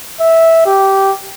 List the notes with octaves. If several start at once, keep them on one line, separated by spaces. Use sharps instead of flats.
E5
G4